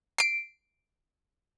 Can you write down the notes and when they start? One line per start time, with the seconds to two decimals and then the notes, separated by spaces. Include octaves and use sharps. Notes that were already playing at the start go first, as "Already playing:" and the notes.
0.18 C7 D7